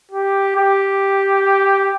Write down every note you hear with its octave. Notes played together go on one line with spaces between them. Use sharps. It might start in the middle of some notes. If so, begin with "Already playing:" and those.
G4
G4